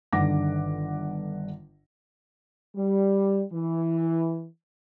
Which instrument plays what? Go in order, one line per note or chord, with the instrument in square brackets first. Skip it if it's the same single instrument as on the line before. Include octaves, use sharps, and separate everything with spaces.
[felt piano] G1 D3 D#3 F#5 D6 A#6
[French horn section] G3
E3